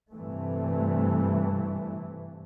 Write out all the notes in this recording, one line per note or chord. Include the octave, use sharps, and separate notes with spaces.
G2 C3 E3 A3